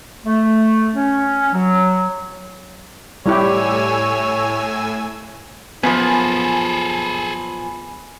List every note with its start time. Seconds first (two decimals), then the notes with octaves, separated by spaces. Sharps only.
0.24 A3
0.94 C#4
1.53 F#3
3.26 A2 G3 E4 G4 C#5 G#5 E6
5.83 F#2 A#2 F3 B3 G#4 A4 G#5 B5